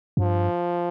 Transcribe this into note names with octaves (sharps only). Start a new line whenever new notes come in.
F2
G2 F3